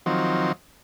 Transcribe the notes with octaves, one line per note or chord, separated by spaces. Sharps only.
D#3 F3 F#3 C4